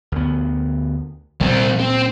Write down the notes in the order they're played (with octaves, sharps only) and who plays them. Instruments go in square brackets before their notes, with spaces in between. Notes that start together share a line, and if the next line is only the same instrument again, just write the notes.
[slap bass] D2 B3
[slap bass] C#2 A#2 [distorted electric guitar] G3 C4
[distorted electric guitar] C4